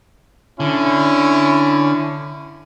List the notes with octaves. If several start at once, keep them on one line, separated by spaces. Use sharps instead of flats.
D3 C#4 E4